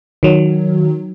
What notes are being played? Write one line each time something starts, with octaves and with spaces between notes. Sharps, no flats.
D#3 F#3